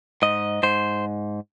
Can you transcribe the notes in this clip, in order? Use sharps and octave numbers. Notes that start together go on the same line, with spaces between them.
G#2 D#5
G#2 C5